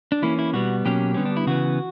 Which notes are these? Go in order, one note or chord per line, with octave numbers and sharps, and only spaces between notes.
D4
E3 A#3 C#4 E4
E4
B2 G3 B3 F#4
B2 F#3 A#3 C#4 G4
D3 G3 B3 C#4
D4
E4
C#3 E3 B3 F#4